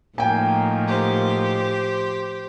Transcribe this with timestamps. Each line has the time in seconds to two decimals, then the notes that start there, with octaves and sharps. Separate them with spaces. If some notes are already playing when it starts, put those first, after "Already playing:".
0.18 A2 F3 A#3 D#4 F#4 G5 G#5
0.88 G4 C5